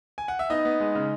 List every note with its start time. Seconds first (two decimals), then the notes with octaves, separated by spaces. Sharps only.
0.18 G#5
0.28 F#5
0.39 E5
0.50 B3 D#4 D#5
0.65 B3
0.80 G#3
0.95 C#3